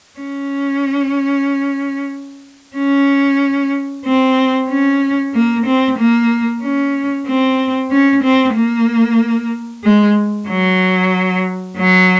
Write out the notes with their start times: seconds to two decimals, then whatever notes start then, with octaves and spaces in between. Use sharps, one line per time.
0.19 C#4
2.76 C#4
4.05 C4
4.69 C#4
5.34 A#3
5.66 C4
5.98 A#3
6.62 C#4
7.27 C4
7.91 C#4
8.23 C4
8.55 A#3
9.84 G#3
10.48 F#3
11.77 F#3